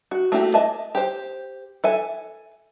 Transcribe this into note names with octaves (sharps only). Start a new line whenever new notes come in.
F#4
A3 A#3 E4 F#4 G4
D#5 E5 G#5 A5
G4 C5
A4 E5 G#5